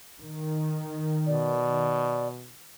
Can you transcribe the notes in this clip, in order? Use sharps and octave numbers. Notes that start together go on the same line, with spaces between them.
D#3
B2 D5